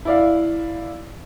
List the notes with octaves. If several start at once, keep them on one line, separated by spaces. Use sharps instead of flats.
E4 D5 F5